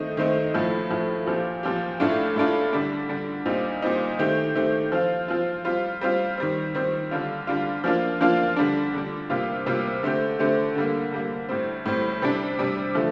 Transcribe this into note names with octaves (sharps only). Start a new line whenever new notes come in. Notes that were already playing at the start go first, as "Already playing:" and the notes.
Already playing: D#3 A3 C4 D#4
D#3 A3 C4 D#4
A2 F3 A3
A2 F3 A3
A#2 F3 C4 G4
A#2 F3 C4 G4
A2 A3 D4 F4
A2 A3 D4 F4
D3 G3 D4
D3 G3 D4
A#2 G3 C4 D#4
A#2 G3 C4 D#4
D#3 A3 C4 G4
D#3 A3 C4 G4
F3 C4 F4
F3 C4 F4
G3 C4 F4
G3 C4 F4
D#3 G3 C4
D#3 G3 C4
D3 G3 D4 F4
D3 G3 D4 F4
F3 A#3 D4 F4
F3 A#3 D4 F4
D3 G3 D4
D3 G3 D4
C3 G3 A#3 F4
C3 G3 A#3 F4
D3 A3 C4 G4
D3 A3 C4 G4
D3 G3 A#3
D3 G3 A#3
A2 G3 C4
A2 G3 C4
C3 G3 D4
C3 G3 D4
D3 F3 A3